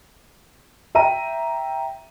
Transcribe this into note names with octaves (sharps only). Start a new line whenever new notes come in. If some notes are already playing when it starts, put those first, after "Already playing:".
E5 G5 A#5 D#7